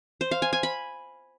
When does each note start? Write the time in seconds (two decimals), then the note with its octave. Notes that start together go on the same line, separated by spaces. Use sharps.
0.21 C5
0.31 F5
0.42 G#5
0.53 G#5
0.63 B5